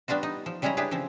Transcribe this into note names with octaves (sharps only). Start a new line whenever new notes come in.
G3 B3 D4 F4 F#4
D#4
F3
C#3 G3 G#3 C#4 E4 A#5
D4 E4 G4 G#4 B4
C#3 F3 C4